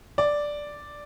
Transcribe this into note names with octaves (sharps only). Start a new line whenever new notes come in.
D5